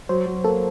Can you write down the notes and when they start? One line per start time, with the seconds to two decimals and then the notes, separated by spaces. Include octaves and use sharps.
0.09 F#3 C5
0.26 F#3
0.44 A#3 A4